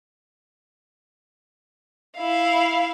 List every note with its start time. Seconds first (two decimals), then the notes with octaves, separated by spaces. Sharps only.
2.17 E4 F5